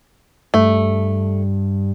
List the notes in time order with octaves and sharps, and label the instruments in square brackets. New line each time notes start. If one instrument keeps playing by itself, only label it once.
[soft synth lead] G2 [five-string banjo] A3